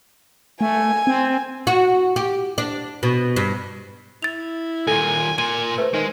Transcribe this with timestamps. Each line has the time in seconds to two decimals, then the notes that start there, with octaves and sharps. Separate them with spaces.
0.61 A3 G#5
1.07 C4
1.67 F#4
2.16 G4
2.58 D4
3.03 B2
3.36 G2
4.22 E4 A6 F7
4.87 D#2 A#2 A4 G#5
5.38 A#2 G#5 D#7
5.78 A3 B4 C5
5.94 D#3 G#3